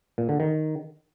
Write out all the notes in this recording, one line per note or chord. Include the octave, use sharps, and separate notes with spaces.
A#2
D3
D#3